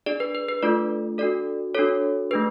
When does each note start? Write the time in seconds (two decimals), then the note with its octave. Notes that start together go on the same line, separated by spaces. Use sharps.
0.06 D4 G#4 D5
0.20 B4
0.35 B4
0.49 B4
0.62 A3 D4 F4 A4 D5
1.18 D4 F#4 A4 D5
1.75 D4 F#4 A4 C#5
2.31 A3 D4 G#4 B4